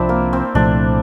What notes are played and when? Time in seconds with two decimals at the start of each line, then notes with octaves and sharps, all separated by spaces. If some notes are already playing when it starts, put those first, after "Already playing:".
Already playing: C2 C3 F3 C4 D4 E4
0.09 A#3
0.33 C4
0.55 C2 A#2 F3 A3 D4